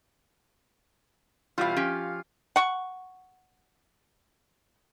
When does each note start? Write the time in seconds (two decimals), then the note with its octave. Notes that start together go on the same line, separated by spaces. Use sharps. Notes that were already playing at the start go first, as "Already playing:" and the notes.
1.58 B2 E3 G3 F4 F5
1.76 F3 C#4 G4
2.56 F#5 C#6